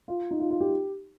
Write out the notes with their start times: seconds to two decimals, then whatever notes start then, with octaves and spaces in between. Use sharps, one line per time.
0.08 F4
0.31 D#4
0.40 F4
0.50 F4
0.61 G4